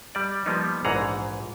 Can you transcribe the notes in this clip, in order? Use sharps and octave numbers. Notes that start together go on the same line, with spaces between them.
G3 D5
F3 G3 A#3 B3 D#4
A#1 G#2 E3 G#4 F#5 A#5